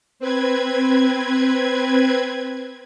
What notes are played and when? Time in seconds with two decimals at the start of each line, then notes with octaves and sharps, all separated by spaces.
0.19 C4 B4 G#6